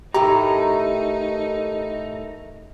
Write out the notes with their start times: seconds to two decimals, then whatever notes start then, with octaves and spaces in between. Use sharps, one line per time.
0.14 A2 D#3 A3 D#4 G4 A#5